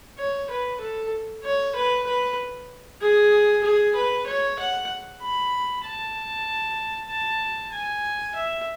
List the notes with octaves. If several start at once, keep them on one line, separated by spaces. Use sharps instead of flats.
C#5
B4
A4
C#5
B4
B4
G#4
G#4
B4
C#5
F#5
B5
A5
A5
G#5
E5